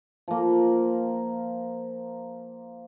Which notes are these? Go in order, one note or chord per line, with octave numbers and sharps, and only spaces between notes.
F3 A#3